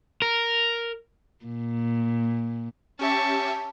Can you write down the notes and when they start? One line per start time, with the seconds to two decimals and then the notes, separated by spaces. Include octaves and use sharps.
0.22 A#4
1.45 A#2
2.99 C#4 G4 E5 A5 C#6